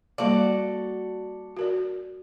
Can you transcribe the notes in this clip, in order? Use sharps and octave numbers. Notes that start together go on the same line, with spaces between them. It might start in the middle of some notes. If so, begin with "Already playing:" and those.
G3 A#3 F#4 A4 D5 F5
F#4 A#4 D5